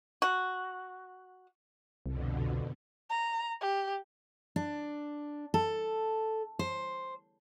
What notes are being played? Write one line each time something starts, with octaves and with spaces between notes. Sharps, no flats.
F#4
C2 F2 B2 D3
A#5
G4
D4
A4
C5